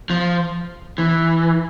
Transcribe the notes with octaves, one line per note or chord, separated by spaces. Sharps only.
F3
E3